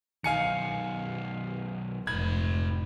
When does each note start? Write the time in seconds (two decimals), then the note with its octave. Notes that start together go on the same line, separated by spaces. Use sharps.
0.24 B1 D#3 F5 G#5 C#7
2.07 F1 G#2 B5 G#6